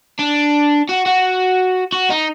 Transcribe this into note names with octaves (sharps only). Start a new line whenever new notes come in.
D4
F#4
F#4
F#4
D#4